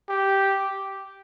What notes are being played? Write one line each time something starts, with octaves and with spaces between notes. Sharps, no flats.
G4